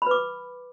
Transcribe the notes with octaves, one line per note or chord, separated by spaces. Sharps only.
B4 B5 D6